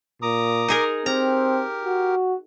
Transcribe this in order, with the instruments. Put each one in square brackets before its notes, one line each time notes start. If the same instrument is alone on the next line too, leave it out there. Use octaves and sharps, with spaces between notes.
[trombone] A#2 [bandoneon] A#5 D6 D#6
[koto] D#4 G#4 A#4
[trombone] C4 [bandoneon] G4 A#4 [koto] A#5
[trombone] F#4